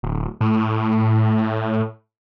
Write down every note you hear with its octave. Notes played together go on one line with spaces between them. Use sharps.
D1
A2